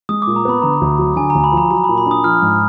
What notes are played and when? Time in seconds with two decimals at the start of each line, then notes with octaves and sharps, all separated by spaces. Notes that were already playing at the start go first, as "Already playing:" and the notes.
0.09 G#3 D#6
0.22 A#2 D6
0.36 A#5
0.45 B3 B5
0.62 D3 A#5
0.81 D2
0.99 F#3
1.16 D3 G#5
1.30 D2 A#5
1.44 B5
1.52 F3
1.57 A#5
1.71 F#3 A#5
1.84 B5
1.89 A#2
1.98 B5
2.06 D4 D#6
2.24 F3 F6
2.42 G#2